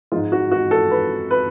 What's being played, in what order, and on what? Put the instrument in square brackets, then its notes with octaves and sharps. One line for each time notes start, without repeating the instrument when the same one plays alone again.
[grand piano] G#2 F3 G#3 F4
F#4
F#4
A4
B4
B4